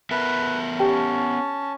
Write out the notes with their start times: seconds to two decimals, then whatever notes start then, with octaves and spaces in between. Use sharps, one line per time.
0.11 B3 A#4 B4 E5
0.80 C#4 G4 G5 A5